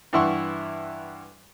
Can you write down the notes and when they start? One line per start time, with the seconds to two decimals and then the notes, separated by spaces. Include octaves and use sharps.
0.13 G2 E3 E4 F#5 C6 C#6